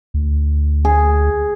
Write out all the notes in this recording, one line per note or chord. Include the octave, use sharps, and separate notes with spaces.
D2
G#4